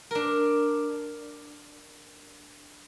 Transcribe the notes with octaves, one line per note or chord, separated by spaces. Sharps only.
D4 A#4